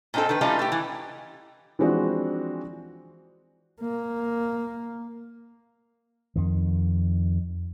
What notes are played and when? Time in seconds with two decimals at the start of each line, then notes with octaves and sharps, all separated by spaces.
0.14 A#2 C4 D4 D#4 A4
0.29 D#3 B4
0.41 E3 G3 A3 C#4 D#4 F4
0.59 A3 G4
0.72 E3
1.79 E3 F3 G#3 C4 D4 F#4
3.81 A#3
6.36 F2 D#3